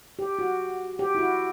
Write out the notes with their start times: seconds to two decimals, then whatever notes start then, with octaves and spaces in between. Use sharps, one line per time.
0.19 G4
0.39 F#4
0.99 G4
1.15 E4
1.19 F#4